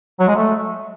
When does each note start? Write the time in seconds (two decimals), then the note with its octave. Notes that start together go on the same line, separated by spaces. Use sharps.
0.20 F#3
0.28 G#3
0.36 A3